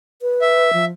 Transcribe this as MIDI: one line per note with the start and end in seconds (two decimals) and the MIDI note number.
0.22 0.70 71
0.41 0.85 76
0.73 0.92 53